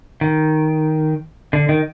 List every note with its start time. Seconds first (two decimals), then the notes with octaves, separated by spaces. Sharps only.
0.21 D#3
1.53 D3
1.69 D#3